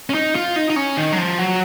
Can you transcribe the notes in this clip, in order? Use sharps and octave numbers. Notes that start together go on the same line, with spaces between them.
C#4
D#4
F4
D#4
D#4
C#4
D#3
F#3
F3
F#3